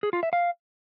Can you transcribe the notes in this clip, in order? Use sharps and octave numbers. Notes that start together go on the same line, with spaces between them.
G#4
F4
E5
F5